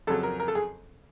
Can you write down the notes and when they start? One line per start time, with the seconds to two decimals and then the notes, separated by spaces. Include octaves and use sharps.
0.07 F2 C#3 F#3 A4
0.23 A#4
0.40 A#4
0.48 A4
0.55 G#4